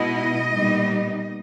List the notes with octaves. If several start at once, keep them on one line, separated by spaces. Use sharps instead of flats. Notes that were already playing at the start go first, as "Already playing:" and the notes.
Already playing: B2 G#3 B3 E4 D#5
A#2 G3 B3 D#4